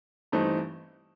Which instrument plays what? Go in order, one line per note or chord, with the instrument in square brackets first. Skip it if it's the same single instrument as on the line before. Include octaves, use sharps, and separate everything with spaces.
[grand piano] G2 E3 A3 C4 D#4